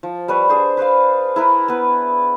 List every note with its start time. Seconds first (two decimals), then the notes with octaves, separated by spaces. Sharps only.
0.03 F3
0.28 G3 B4 C#5
0.49 D4 G#4 C5
0.77 B4 C5 D5 F5
1.36 E4 A#4 B4
1.68 B3 B4